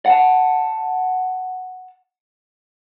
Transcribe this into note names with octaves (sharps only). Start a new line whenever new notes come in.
F#5 A5